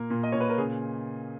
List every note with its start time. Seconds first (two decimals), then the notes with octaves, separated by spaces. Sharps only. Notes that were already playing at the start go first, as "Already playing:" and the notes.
Already playing: A#2 A#3 A#4
0.10 A#2
0.23 D#5
0.32 A#2 C#5
0.40 B4
0.50 A#4
0.58 C#3 G#4